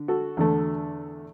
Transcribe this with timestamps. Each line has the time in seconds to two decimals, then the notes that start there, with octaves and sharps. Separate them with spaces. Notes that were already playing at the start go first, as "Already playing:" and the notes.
Already playing: D3
0.08 F#4 A4
0.37 E2 D3 A3